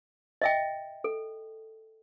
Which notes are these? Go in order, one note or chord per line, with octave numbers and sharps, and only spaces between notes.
D#5 E5 G5
A4